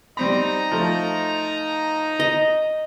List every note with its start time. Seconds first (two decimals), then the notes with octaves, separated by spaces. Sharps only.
0.17 G3 C4 D#4 A#5 B5
0.71 F3 A3
2.20 D#5